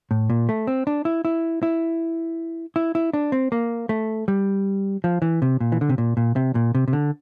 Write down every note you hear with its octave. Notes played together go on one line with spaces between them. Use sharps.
A2
A#2
A3
C4
D4
E4
E4
E4
E4
E4
D4
C4
A#3
A3
G3
F3
E3
C3
A#2
E3
D3
C3
A#2
A#2
C3
A#2
C3
C3
D3